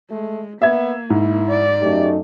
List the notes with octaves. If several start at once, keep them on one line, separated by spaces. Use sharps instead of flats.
G#3 A3
A#3 B3 E5 G#6
G#2 E4
D5
F#2 A3 D#4 G4